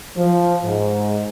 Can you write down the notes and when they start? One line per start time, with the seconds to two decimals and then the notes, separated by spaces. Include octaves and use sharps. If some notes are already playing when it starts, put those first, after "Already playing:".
0.16 F3
0.63 G#2